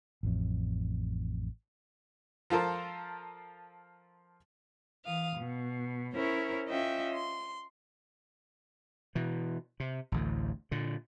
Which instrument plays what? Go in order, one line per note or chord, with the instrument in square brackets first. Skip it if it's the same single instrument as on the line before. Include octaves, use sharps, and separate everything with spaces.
[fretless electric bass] A1 F2
[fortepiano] F3 F4 A4 A#4 C5
[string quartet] E3 F5 D#6
B2
C#4 E4 A#4 C5 C#5
C#4 F4 D#5 E5 G5
C6
[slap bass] B2 E3
C3
A1 D2 A2
A#2 D3